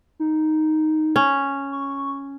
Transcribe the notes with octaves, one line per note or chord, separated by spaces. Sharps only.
D#4
C#4
C#6